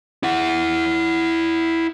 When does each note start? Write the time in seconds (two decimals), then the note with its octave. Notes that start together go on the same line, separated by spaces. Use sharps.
0.23 E4 F#5